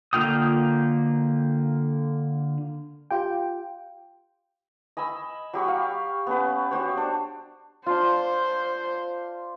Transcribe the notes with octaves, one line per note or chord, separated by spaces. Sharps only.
D3 A#3 F4 G5 D#6
F4 G4 G5
D#5 G#5 B5 E6
F#3 G4 B5 C#6
F5
B3 C#4 B4
F#4 G4 C5 C#5
D4
D4 F4 C5